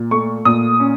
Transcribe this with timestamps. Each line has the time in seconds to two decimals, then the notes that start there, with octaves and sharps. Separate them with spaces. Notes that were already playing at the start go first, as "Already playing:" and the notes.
Already playing: A#2
0.11 A3 C#6
0.45 A#2 D#6
0.80 C#4